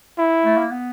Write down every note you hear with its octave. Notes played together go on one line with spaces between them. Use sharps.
E4
A3
A#3
B3